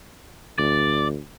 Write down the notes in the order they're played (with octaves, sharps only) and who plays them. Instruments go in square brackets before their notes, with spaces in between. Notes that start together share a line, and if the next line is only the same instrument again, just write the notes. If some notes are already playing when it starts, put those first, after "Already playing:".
[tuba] D2 [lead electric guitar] D5